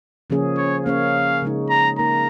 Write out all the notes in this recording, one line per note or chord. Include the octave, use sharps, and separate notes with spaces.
C#3 F3 A#3 C#4 G#4
C#5
A#3 C#4 G#4 C#5 F5
C#3 G#3 D#4
A#5
A#3 D#4 A#4 A#5